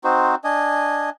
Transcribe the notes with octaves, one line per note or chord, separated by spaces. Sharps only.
C4 D#4 F#4 C5
D4 D#5 G#5